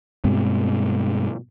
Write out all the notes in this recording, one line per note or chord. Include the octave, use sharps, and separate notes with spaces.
G2 B2 G#3 C4